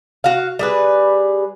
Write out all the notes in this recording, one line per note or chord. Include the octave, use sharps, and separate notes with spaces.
F#4 F5
G3 G#4 B4